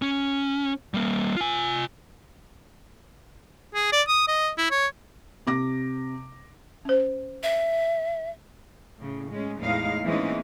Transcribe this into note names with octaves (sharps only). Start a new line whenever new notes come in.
C#4
G3 A#3
F4 G#5
G#4
D5
D#6
D#5
E4
C#5
C3 D6 A#6
C#4 C5
E5
A2 C#3
G#3 C#4
E2 A2 G#3 D#4 F5
E3 G#3 A#3 C4 C#4 D#4